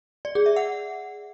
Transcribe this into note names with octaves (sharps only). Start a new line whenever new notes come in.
D5
G#4
E5
F#5